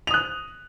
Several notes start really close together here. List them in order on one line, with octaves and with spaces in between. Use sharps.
F7 D#6 F#6